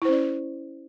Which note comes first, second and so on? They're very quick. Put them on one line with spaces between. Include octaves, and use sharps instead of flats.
E4 C5 C#4 D5